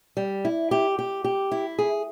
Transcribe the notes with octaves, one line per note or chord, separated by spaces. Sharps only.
G3
E4
G4
G4
G4
E4
G#4